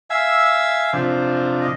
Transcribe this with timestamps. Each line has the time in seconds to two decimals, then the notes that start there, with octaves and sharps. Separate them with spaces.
0.10 E5 F5 G#5 E6
0.93 C3 F3 D4 C5
1.61 D#5